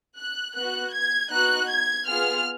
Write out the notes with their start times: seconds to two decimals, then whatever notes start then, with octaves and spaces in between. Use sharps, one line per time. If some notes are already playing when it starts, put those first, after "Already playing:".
0.17 F#6
0.55 B3 F#4 F#6
0.93 G#6
1.31 B3 D#4 F#4 F#6
1.70 G#6
2.08 B3 F4 G#4 F6